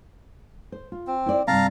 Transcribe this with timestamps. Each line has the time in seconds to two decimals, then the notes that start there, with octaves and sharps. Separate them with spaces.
0.72 C5
0.92 F4
1.07 C4
1.26 E4 C5 D5
1.47 G2 C3 C4 F5 A5 A#5